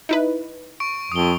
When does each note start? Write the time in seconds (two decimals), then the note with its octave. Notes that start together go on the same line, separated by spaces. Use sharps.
0.09 D#4 E4 B4
0.80 C#6 D7
1.12 F2 D#6 G7